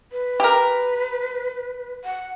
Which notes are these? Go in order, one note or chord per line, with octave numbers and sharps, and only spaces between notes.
B4
G4 A#4
F#5